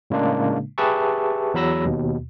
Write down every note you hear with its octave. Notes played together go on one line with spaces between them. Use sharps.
A2 C#3 G#3 A#3 D4
G4 G#4 B4 E5 A5 C#6
E2 F#3 B5 E6 A#6
D#2 B2